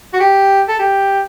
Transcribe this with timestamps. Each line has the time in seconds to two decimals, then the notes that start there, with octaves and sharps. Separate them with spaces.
0.13 F#4
0.20 G4
0.68 A4
0.79 G4